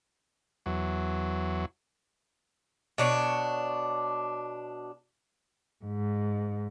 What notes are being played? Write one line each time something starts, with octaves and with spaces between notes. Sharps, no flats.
E2 F#3
B2 D4 C#5
G#2